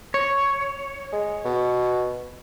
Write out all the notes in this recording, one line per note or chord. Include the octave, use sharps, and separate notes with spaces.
C#5
G#3
B2